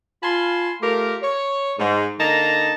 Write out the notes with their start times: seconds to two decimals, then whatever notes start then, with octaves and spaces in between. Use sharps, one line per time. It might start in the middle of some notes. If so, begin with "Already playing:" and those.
0.23 F4 G#5 A5 B5 C6
0.81 A3 F4 G4 A#4
1.22 C#5
1.78 G#2
2.19 D3 A#3 D#4 A5 A#5